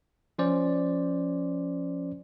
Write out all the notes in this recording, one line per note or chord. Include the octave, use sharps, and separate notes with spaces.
F3 C#4 C5 D5